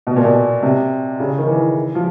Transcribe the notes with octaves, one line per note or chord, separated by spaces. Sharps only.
B2
A#2
B2
C3
C#3
D#3
E3
F3